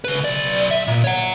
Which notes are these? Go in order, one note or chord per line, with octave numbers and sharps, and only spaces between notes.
C#3 B4
B1 D5
E5
A#2
C#5 F#5